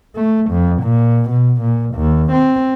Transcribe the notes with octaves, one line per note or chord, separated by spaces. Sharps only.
A3
F2
A#2
B2
A#2
D#2
C4